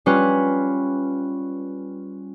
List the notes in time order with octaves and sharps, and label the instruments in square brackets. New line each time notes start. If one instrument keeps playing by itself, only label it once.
[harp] G3 C#4 F4 B4